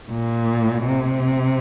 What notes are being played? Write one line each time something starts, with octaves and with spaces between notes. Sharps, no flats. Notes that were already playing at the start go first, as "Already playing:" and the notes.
A#2
C3